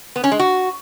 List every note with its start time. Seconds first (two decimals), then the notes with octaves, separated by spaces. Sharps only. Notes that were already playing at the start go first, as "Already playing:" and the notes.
0.16 B3
0.24 C#4
0.32 G#3
0.39 F#4